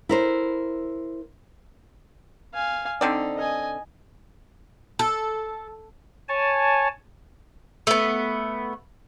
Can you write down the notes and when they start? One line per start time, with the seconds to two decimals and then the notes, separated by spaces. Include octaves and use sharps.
0.09 E4 A#4 C5
2.54 F5 G#5
3.01 D3 C4 D#4 D5
3.37 D#5 G#5
4.99 A4
6.28 C#5 G#5 A5
7.87 A3 B3